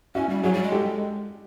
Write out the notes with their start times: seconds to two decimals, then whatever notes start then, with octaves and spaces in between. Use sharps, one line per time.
0.15 C#4 E4 F#4
0.29 G3
0.43 F#3 F#4 G#4
0.53 G3
0.63 G#3
0.72 G4 A4